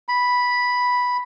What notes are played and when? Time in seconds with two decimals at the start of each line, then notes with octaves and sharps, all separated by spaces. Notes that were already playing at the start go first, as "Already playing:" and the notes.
0.08 B5